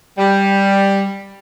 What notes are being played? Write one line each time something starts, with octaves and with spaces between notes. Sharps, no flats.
G3